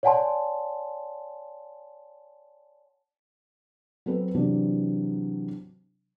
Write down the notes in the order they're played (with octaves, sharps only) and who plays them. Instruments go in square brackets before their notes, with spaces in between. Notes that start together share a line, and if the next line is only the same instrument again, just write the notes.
[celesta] C#5 D5 F#5 G#5 A5 C6
[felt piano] F#3 C4 A4 B4
C3 E3 F#3 D4